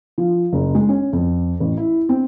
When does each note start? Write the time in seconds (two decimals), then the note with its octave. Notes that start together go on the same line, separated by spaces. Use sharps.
0.18 F3
0.53 F#1
0.75 G#3
0.89 C#4
1.13 F2
1.60 A1
1.77 E4
2.09 C4